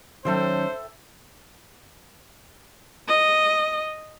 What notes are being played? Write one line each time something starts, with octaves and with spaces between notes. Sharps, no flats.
D#3 F#3 C#4 A4 C5 E5 G5
D#5